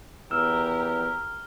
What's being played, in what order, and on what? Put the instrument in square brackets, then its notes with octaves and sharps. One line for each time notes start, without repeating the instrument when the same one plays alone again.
[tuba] E2 [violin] G4 A#4 [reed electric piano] E6 [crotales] F6